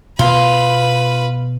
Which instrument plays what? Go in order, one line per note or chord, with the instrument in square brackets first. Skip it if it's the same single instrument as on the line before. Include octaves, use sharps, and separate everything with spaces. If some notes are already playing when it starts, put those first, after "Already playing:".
[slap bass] B2 B3 [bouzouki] F4 [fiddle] B4 B5